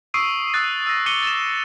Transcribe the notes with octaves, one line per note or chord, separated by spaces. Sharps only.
C#6 D#6 E6 C7 D7 D#7
D#6 E6 F#6 A6
E6 A#6
D6 F#6 C#7 D#7 G7
A6 D#7 E7